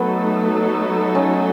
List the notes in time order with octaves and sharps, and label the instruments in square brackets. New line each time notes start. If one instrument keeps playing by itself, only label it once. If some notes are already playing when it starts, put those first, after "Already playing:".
Already playing: [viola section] F#3 A3 D#4 A4 [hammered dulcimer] B3
[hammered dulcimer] C#4